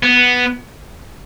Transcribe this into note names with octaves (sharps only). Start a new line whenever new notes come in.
B3